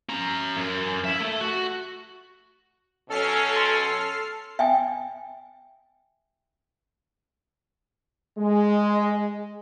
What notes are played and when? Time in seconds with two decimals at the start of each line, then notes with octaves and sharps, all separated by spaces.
0.09 C#4 A#5
0.57 F#2
1.05 E4 E5
1.20 A3
1.41 F#4
3.10 B2 F#3 C#4 A4 F6 C7
3.56 C6 A6
4.59 E5 G5 G#5
8.38 G#3